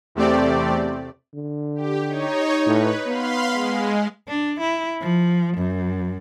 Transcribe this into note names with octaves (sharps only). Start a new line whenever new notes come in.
E2 C3 A3 C4 G4 D5
D3
G4
D#4 C#5
A2 B4
B3 F5 B5 C6
G#3
D4
E4
F3
F#2